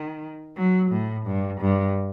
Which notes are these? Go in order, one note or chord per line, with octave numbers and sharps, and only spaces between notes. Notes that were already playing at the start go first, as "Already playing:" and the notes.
Already playing: D#3
F#3
A2
G2
G2